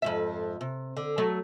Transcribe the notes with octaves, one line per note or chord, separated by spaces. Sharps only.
F2 G#2 E5
C3
D3
F#3 A3